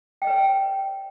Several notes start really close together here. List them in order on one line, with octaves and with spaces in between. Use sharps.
G5 D#5 B4 C#5